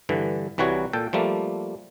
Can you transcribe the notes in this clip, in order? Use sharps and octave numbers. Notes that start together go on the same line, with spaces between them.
G2 D3 E3
C2 E3 G3 F#4 C#5
A#2 A4 G5
F3 G3 A3 A#3